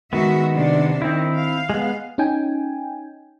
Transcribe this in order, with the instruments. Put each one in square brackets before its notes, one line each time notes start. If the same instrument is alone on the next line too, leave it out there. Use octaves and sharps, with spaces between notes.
[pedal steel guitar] D#3 B3 [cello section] G#3 F#4 E5
[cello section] C3 D4
[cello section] D#3 [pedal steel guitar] C4 E4
[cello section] F5
[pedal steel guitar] G#3 B3
[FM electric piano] C#4 D#4 G5 G#5